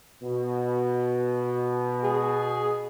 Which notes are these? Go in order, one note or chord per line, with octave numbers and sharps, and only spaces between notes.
B2
G#4